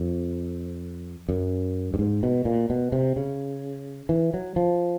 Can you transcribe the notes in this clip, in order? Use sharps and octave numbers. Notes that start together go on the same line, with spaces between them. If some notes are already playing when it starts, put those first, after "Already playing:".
Already playing: F2
F#2
G2
G#2
B2
A#2
B2
C3
C#3
E3
F#3
F3